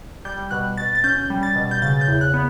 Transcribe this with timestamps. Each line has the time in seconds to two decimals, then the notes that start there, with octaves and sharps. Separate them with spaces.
0.25 G3 G6
0.51 B2 F#6
0.77 B2 A6
0.95 A6
1.04 C#4 G6
1.30 G3
1.43 A6
1.56 B2
1.71 G6
1.82 C#3 A6
2.01 G6
2.08 E2
2.21 F#6
2.34 B3